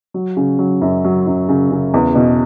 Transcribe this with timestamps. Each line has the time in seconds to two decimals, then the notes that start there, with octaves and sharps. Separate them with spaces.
0.14 F#3
0.37 C#3
0.59 F#3
0.81 F#2
1.04 F#3
1.26 F#2
1.49 C#3
1.72 C#3
1.94 E2
2.15 B2